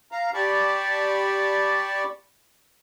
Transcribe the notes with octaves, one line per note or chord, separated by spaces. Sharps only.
F5 A#5
G4 D5 A5 B5 C#6